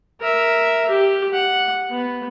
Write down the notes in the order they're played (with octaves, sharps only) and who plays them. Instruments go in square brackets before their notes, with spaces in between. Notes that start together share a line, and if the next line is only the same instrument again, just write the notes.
[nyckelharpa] A#4 E5
G4
F#5
B3